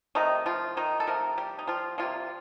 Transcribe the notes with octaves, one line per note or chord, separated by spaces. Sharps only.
C3 D#3 F3 A3 D#4
F3 F4
D#3 D#4
A4
C3 F3 A3 A#4
G3 G4
D#4
F3 F4
C3 F3 G3 A#3 F4